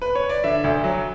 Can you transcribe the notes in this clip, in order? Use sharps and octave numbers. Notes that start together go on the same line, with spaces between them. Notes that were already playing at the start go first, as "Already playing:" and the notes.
B4
C#5
D5
D3 E5
D2
F#3